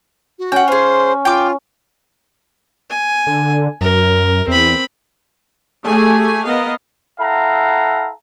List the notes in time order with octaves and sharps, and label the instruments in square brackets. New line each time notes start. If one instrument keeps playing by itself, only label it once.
[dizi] F#4
[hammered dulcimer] C#4 [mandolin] F#5 G5
[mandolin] F4 G#4 [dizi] C5
[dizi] F4 [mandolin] G5 D6
[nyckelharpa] G#5
[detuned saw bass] D3
[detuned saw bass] F#2 [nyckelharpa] A#4
[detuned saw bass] E2 [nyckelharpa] C4 B5
[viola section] A3 G4 G#4 G#5
B3 A#4 D#5 F5
[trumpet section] E4 A4 F5 F#5 A#5